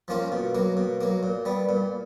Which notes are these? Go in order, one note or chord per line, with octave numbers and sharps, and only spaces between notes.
F3 A#3 C#4 F4
B2
F#3 A#3
B2
F#3 A#3
A#2
G3 B3
A#2